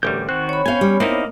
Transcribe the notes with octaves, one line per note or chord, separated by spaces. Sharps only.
A1 D2 G3 A#4 G6
D#3 C4 F#4 F#6
C#5 B5
B3 C#4 F5 G5 G#5
G3
A#3 C4 D#4 E4 D5 D#5 F5